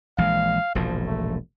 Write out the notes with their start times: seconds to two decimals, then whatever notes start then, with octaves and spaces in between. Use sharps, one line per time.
0.18 A#1 E3 G#3 F5
0.75 E1 A#1 G#2 F3
1.06 A3